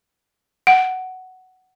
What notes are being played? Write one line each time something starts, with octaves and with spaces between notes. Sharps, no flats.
F#5